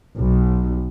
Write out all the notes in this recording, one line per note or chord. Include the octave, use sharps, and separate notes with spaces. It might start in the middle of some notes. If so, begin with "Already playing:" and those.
B1